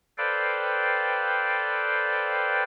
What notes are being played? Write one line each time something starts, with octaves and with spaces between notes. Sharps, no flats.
A4 B4 C5 D5 F5 G5